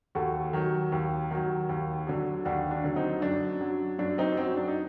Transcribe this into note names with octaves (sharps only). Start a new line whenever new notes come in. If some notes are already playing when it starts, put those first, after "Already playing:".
D#2 F#4 A4
D#3 F#3
D#2
D#3 F#3
D#2
D3 F#3
D#2 D4 F#4
D4
D3 F#3
C4 D#4
F#2 D4
F#3
F#2 D4
C4 D#4
F#3 C4
D4
D#4